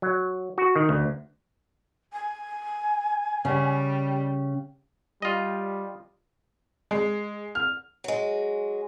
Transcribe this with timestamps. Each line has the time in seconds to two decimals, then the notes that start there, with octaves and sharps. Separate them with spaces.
0.02 F#3
0.58 F#4
0.76 D#3
0.89 D2
2.13 G#5
3.45 C#3 G3
5.22 G3 F4 D#5
6.91 G#3
7.55 F6
8.04 F#3 G#3